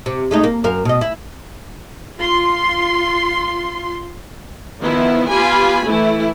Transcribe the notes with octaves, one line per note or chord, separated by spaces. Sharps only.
C3
G#3 A3 D#4
A#3
F#2 A#4 F5
B2 D#5
E4
F4 C6
D#3 F3 B3 E4
B3 F4 G4 G#5 B5
E3 A3 E4